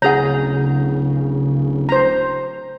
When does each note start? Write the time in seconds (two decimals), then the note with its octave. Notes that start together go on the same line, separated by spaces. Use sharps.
0.02 D1 C#3 G#4 C#5 F#5 A#5
1.89 C5 A#5